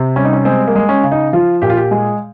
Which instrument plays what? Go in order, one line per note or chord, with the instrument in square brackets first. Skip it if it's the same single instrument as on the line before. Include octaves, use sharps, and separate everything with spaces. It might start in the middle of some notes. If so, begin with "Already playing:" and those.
Already playing: [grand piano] C3
G3 C#4
D#4
C#4
G#3 C4
A#3
G#3
C#4
C#3
D#4
F3 F4
A#2 G4
F4
G4
G#3 G#4